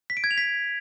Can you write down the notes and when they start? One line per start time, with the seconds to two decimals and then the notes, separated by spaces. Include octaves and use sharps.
0.10 B6
0.17 D7
0.24 G#6
0.31 F7
0.38 B6